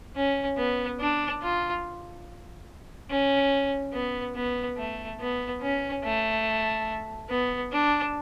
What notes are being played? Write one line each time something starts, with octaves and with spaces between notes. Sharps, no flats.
C#4
B3
D4
F4
C#4
B3
B3
A3
B3
C#4
A3
B3
D4